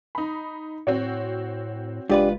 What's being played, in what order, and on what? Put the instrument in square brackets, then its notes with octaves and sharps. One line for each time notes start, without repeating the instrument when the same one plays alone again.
[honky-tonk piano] D#4 B5
[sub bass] A2 [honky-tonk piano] C4 F#4 C#5
[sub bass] F#1 [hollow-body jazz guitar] G#2 F4 B4 [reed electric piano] D4 G4 D5